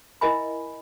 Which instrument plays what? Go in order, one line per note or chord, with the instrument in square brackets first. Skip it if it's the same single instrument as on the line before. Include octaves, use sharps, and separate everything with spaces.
[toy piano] E4 A#4 D#5 E5 G#5 B5